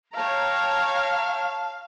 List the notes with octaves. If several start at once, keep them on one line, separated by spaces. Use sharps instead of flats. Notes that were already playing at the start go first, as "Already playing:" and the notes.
C#5 F5 G5 A5 A#5